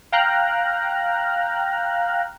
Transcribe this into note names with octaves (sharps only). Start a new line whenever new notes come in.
F5 G5 A#5 F6 F#6